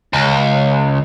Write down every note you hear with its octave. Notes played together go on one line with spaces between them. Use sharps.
C#2